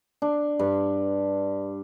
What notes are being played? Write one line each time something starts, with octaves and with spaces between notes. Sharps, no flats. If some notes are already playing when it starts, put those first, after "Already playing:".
D4
G2